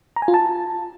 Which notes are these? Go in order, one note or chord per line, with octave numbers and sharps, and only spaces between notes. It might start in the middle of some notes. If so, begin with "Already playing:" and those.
A#5
G#5
F4
A5